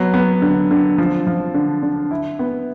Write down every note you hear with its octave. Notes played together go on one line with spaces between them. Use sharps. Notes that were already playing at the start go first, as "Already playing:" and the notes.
Already playing: F#3 B3
B3
D3
D3
F3
F3
D3
D3
E4
B3